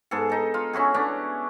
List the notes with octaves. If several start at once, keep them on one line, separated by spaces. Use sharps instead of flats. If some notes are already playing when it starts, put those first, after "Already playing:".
G#2 B3 G#4 A4
D#4 A4
F4
C#4 E4 F#4 G#4
B3 C#4 D4